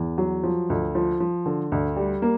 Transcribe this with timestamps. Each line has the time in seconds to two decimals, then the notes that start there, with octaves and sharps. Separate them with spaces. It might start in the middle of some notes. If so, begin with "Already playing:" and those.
Already playing: E2
0.18 F#3
0.44 F3
0.70 D2
0.95 F3
1.20 F3
1.46 D3
1.72 D2
1.96 G3
2.22 A#3